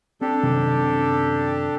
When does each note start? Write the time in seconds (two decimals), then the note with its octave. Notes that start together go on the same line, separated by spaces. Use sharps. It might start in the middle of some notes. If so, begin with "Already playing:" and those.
0.21 C4 D4 G4 A4
0.43 F#2 C3 D#3 C4